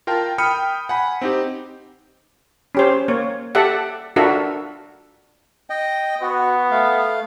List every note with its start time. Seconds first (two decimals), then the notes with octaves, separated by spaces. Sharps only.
0.07 F4 A#4 G5 A5
0.38 G5 B5 D#6 F6 C#7 D#7
0.89 F#5 G#5 B5
1.21 C4 D#4 G4
2.75 C#4 G4 C5
3.08 A#3 C#5
3.55 G4 A4 D5 E5 F#5
4.16 D4 F4 F#4 A4 A#4 E5
5.70 D#5 G5
6.22 B3 F#4
6.71 A3 F5